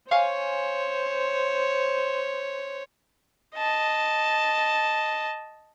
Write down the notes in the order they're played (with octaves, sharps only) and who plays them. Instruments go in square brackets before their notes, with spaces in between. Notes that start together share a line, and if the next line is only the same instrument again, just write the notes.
[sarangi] C5 [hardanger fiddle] C#5 [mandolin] F5 G#5 C#6
[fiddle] D#5 A5